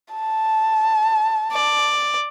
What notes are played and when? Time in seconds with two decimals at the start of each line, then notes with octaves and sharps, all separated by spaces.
0.14 A5
1.52 D5